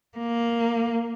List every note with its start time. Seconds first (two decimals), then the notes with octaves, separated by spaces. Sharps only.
0.18 A#3